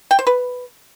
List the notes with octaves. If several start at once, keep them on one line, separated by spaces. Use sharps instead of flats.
G5
C5
B4